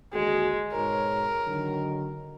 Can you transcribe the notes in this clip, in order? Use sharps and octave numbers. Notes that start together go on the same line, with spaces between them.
D#2 D3 G#3 F#4
G#2 B2 A#4 C#5
D3 D#3 F#3